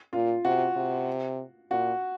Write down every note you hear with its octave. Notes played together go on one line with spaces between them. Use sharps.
A#2 F4
C3 F#4
C3
A#2 F#4